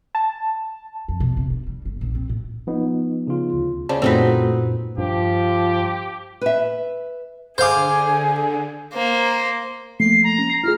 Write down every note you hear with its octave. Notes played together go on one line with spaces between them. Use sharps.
A5
F2
B2
C3
D3
G3
G1
A#1
C4
A2
F3 B3 D#4
C#3 F4
D2
C#3 C5 D5 A5
F#2 A#2 A3 C4 D#4 F#4 B4
G2 F3 G4
B4 E5
D3 G#4 C5 F5 D6 G6
A#3 C5
F3 A3 A#3 C7
A#5
C#4
A#6 C7
E4 F4 G#4 F6